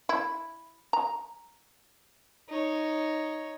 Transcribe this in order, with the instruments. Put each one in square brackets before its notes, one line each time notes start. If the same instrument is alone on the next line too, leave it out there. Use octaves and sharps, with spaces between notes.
[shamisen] E4
A#5
[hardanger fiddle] D#4 C#5